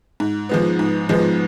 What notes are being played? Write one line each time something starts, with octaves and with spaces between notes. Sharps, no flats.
G#2
F3 G#3 B3
G#2
F3 G#3 B3